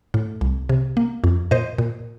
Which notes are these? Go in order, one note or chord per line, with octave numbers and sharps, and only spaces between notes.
A2
C2
C3
A#3
F2
A#2 C5 D#5
A#2